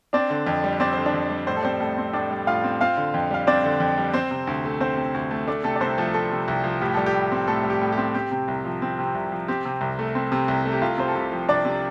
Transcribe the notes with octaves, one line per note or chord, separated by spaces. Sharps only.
C4 D4 D5
D3
F2
G3
C4 D5
D3 C5
D4 D5
F2
G3
A2 C5
A4
G3 C4 C5
A2 A3 A4
C4
A2 D4 D5
G3
A2 F4 F5
C4
C4 F4 F5
D3
F2
G3 F5
C4 D4 D5
D3
F2
G3
C4 C5
C3
D2
A3
C4 C5
C3
D2
A3
A3 D4 D5
C3 A3 A4
D5
C2 C4 C5
F3 A3 A4
A3 A4
C3
C2
F3
A2 G4
G3 A4
G4
A2
C4
A2 A3 A4
G3
G4
A2
G4
C4
C4 G4
C3
C2
F3
C4
C3
C2
F3
C4 G4
C3
C2
A3
C4
C3
C2
A3
G4
C2 F4
C3 C5
A4
C2 G4
F3
C2 D4 D5
C3